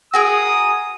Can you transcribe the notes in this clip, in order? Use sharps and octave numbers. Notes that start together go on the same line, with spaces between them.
F#4 G#4 A#4 D#6